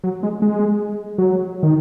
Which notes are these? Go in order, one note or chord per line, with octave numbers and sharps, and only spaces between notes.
F#3
G#3
G#3
F#3
D#3